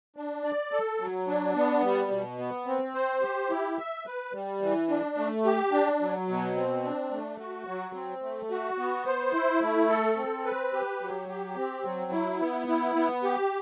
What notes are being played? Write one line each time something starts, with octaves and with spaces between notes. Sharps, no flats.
D4
D5
A4
F#3
D4
B3
G3
B2
B3
C4
C5
G4
E4
E5
B4
G3
E3
D4
A3
G4
D4
F#3
B2
C4
D4
A3
F#4
F#3
C4
A3
F#4
B3
C5
E4
A3
A4
C4
B4
G4
F#3
G4
C4
F#3
E4
B3
E4
B3
G4